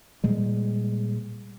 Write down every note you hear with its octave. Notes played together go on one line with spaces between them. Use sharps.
A#2 G3 G#3